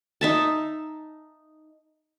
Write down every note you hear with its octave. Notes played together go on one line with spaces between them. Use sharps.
D#4 E5 A5